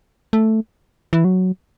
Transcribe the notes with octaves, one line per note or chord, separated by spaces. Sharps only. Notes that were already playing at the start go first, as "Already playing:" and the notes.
A3
E3
F#3